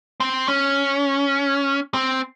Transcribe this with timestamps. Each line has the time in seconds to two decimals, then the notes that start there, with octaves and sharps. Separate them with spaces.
0.20 C4
0.48 C#4
1.94 C4